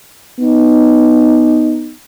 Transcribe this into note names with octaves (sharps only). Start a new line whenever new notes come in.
B3 D#4